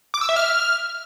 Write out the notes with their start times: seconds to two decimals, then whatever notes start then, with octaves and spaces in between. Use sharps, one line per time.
0.14 D6
0.21 E6
0.29 E5
0.36 F6